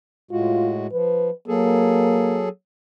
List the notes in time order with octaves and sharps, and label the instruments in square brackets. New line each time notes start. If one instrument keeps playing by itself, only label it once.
[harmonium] A2 G#3 F#4 [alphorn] F4
[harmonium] F3 [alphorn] B4
[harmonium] F#3 G#4 A4 [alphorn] A#3